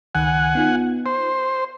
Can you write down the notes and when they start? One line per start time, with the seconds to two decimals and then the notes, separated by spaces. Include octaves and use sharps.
0.15 C#2 D#3 F#5 G#5 F#6
0.55 B3 D#4 F4
1.06 C5